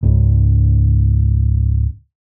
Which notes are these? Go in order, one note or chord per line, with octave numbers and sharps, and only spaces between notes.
C#2 G#2